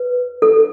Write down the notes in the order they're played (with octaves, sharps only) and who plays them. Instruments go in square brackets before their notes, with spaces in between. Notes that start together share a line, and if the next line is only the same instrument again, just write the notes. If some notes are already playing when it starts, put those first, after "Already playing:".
Already playing: [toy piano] B4
A4